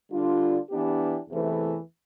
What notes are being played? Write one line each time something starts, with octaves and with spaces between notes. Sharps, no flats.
D3 G3 D4 F4
E3 B3 D4 G4
E2 C3 E3 A3